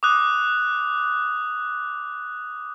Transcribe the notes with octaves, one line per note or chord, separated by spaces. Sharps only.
D6 D#6 F#6